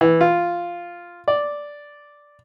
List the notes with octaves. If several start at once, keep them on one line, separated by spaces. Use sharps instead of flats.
E3
F4
D5